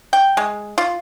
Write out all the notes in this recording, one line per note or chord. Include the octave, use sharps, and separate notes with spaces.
G5
G#3
F4